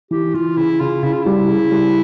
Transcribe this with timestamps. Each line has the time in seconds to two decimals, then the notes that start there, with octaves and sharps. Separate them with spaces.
0.11 E3 G4
0.34 E3 F4
0.57 C#3 E4
0.80 C#3 F4
1.03 C#3 E4
1.13 F4
1.23 G3 E4
1.49 C#3
1.72 G3